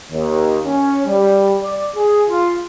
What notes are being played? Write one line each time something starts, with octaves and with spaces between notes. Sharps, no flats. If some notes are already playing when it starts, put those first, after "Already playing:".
D#2
C#4
G3
D5
G#4
F4